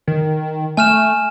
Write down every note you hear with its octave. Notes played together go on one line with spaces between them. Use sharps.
D#3
A3 G#5 F6 E7